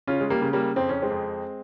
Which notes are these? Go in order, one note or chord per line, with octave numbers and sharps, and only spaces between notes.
C#3 C#4 F4
G#3
G3 A#3
C#3
G3 A#3
F2 C4
C#4
G#3 C4
F2